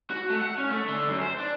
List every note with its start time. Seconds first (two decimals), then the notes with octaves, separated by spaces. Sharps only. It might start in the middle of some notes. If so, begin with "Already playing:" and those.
0.10 F#4
0.30 A3
0.41 F#5
0.58 C#4
0.71 A3
0.88 D3
1.08 F#2
1.22 C5
1.38 D4